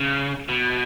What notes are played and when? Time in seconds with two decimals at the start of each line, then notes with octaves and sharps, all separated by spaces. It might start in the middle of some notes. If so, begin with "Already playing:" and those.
Already playing: C#3
0.49 B2